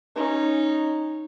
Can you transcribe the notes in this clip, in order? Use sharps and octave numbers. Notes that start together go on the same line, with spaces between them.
C#4 D#4